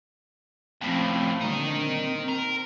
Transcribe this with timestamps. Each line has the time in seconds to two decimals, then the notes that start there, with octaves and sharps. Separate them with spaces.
0.81 F2 A2 F3 C4 C#4
1.41 A#2 D3 G3 D#4 A#4
1.78 C4
2.29 A#4